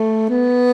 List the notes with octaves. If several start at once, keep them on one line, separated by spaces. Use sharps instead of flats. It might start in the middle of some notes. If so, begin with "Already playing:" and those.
Already playing: A3
B3